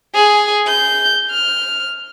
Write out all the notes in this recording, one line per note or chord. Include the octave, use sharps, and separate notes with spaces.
G#4
G6
F6